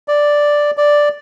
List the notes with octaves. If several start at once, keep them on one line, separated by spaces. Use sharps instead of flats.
D5
D5